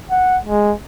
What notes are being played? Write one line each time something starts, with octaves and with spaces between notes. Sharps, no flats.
F#5
G#3